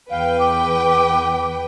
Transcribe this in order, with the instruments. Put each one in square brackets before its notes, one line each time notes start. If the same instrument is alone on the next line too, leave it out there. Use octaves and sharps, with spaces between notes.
[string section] E2 B4 G5 [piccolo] F5
[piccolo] D6